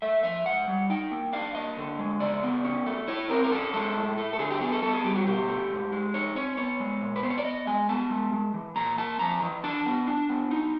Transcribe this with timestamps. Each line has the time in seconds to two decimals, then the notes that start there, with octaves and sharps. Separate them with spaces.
0.02 A3 E5
0.23 F3 E5
0.46 G#2 F#5
0.68 G3
0.90 D#4 G5
1.12 A#3
1.33 D4 F5
1.55 A#3 D#5
1.77 D3
1.99 G#3
2.20 C#3 D5
2.43 B3
2.65 C#4
2.86 A3
3.08 E4 C#5
3.30 C4 A#4
3.44 A#4
3.52 C#4 A4
3.73 G#3 A4
3.95 A2
4.18 A3
4.33 A4
4.39 D3 G#4
4.50 G4
4.61 B3 G#4
4.72 A4
4.82 B3 A4
4.94 G#4
5.04 G3 G4
5.16 F#4
5.27 B2 G4
5.48 A3
5.70 G#2
5.92 G#3
6.14 D#4 C#5
6.35 C4 C#5
6.57 B3 C#5
6.80 G#3
7.02 A#2
7.16 B4
7.23 B3 C5
7.30 C#5
7.38 D5
7.45 B3 D#5
7.67 G#3 G#5
7.89 B3 A5
8.10 G#3
8.32 G#3
8.54 E3
8.76 A#2 A#5
8.98 A#3 A5
9.19 F2 A#5
9.42 E3
9.64 D4 A5
9.86 B3
10.07 D4
10.29 B3
10.51 D#4